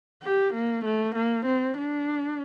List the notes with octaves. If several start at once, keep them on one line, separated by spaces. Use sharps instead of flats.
G4
A#3
A3
A#3
C4
D4